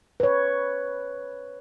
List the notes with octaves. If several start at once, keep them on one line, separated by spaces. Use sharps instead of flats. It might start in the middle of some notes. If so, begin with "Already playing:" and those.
B4 C#5